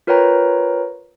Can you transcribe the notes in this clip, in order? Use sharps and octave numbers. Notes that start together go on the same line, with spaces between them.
F4 A#4 B4 C#5 G5 A#5